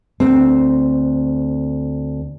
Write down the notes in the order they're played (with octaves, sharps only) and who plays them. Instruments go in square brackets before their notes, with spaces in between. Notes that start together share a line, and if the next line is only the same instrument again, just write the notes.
[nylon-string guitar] D2 C4